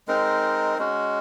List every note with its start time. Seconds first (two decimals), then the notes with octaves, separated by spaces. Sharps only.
0.08 G#3 C4 D#4 A#4
0.78 G#3 C#4 F#4